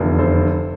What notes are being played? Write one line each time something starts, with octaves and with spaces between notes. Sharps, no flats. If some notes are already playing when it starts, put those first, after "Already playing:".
Already playing: F1 E2 D3 F3
A4 C5